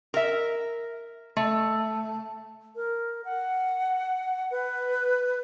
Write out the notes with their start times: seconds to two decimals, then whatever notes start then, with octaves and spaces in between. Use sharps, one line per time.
0.14 A#4 E5
1.37 A3
2.76 A#4
3.25 F#5
4.51 B4